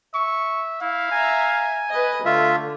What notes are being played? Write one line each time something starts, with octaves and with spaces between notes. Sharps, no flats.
E5 C#6
E4 F5
E5 G#5 A#5
B4 D#5
D3 A3 F4 E5